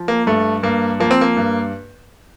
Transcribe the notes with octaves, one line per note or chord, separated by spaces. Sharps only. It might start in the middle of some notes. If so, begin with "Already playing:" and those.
Already playing: F3
A#3
G2 A3
G2 A#3
F3 A#3
C4
A#3
G2